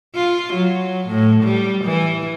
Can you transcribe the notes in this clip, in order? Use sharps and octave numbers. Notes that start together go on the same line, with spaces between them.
F4
F#3
A2
G3
E3